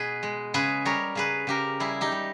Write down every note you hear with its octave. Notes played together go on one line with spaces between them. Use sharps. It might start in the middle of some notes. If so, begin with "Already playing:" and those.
Already playing: B2 G#4 B4
G#3
C#3 G#4 B4
G3 A#4 C#5
C#3 G#4 B4
C#3 G4 A#4
G3 E4 G#4
D#4 G4
G3